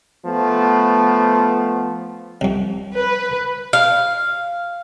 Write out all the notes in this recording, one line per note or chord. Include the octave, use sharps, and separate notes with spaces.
F3 A3 B3
C2 F2
B4
F5